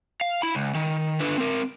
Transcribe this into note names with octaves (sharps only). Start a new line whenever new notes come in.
F5
E4 B5
C#2
D#3
D3 B4
C4 A#4